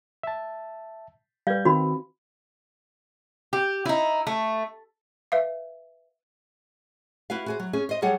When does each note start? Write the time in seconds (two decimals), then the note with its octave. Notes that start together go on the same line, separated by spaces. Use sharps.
0.23 E5 A5
1.47 G3 B4 F5 G6 G#6
1.65 D#3 C4 F#4 B5
3.53 G4
3.86 D#4 E4
4.27 A3
5.32 B4 E5 F5
7.30 E4 F#4 B4 F5
7.46 F#4 G#4 C5
7.60 F#3
7.73 C#4 G#4 C#5
7.89 C5 D#5
8.02 F#3 G3 G#4 C#5 F#5